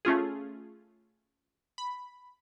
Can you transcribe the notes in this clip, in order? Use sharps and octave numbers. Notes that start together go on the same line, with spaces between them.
A3 C#4 F4 G#4
B5